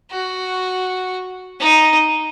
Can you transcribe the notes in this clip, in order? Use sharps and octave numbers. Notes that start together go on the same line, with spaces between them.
F#4
D#4